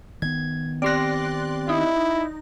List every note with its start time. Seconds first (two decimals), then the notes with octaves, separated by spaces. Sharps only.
0.22 D#3 B3 G#6
0.82 C4 G4 D5 C6 F#6 A#6
1.69 D#4 E4